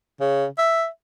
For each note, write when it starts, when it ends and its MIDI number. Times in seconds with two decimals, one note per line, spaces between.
0.20 0.46 49
0.58 0.87 76